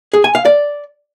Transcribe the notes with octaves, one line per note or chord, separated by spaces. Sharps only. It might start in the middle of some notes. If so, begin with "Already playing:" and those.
G#4
G#5
F5
D5